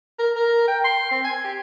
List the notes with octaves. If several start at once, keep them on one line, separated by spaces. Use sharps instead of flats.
A#4
A#4
G5
C6
C4
G#5
G4